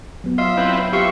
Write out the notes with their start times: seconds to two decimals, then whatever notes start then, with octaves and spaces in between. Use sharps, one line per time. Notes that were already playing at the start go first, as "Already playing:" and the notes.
0.24 F#3 B3
0.38 F4 D#5 E5
0.57 C4 E4 B4
0.93 F4 G4 E5 C#6